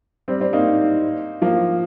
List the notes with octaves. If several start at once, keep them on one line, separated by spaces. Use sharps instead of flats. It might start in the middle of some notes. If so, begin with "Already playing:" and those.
G3 C4
G3 C4
A#3 D#4
F3 A#3